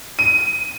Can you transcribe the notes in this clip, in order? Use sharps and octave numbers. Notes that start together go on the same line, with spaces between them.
D#7